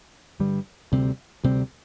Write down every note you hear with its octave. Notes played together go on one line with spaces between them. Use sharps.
G2 D3 G3
D2 C3 G3 C4
D2 C3 G3 C4